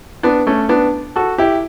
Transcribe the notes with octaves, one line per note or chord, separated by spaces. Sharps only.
B3 D4
A3 C#4
B3 D4
F#4 A4
E4 G4